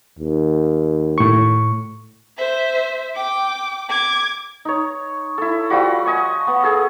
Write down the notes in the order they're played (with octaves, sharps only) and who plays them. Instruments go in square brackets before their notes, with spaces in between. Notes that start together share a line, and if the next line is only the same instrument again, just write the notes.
[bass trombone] D#2
[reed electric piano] A2 C#6
[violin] C5 E5
G5 D6
D6 G#6
[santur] D#4 C#5
E4 A4
F3 G3 F#4
D#5 G#5 C#6
B3
G#4 A4